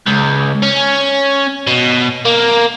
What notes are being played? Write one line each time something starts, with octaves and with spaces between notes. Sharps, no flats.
C#2
C#4
B2
A#3